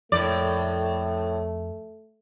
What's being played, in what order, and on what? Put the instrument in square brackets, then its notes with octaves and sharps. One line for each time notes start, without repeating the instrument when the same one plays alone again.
[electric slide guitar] F2 A#4 [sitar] A2 D5 [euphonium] A3